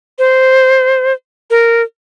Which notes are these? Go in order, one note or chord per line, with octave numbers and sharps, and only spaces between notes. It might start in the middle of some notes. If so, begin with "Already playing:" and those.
C5
A#4